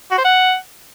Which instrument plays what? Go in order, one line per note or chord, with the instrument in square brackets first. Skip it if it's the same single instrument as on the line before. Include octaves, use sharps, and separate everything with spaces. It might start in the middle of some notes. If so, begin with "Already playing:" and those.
[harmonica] F#4
C5
F#5